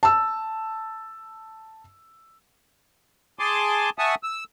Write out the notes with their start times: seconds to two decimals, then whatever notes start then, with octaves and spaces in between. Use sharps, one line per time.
0.03 A5 E6
3.39 G#4 G#5 A5 C6 D6
3.98 E5 F#5 G#5 A5 C#6 D#6
4.23 E6